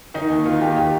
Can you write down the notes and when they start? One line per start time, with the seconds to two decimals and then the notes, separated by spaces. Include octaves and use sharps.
0.14 D#3 D#4
0.30 D#2
0.45 D#3 F4
0.61 D#2 G4
0.77 D#3 G4